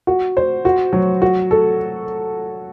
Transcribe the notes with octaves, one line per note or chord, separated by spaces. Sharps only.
F#4
C5
F#4
F#3
F#4
A4